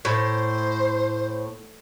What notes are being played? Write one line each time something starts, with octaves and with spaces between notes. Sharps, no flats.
A2 C5